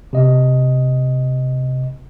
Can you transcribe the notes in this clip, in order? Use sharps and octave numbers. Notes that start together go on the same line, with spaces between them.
C3 D#5